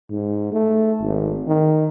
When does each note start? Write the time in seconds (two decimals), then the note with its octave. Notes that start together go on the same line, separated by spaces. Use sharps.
0.10 G#2
0.53 A3
1.01 G#1
1.47 D#3